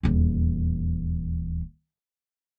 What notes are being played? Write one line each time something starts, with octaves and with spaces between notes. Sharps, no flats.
D#1 E2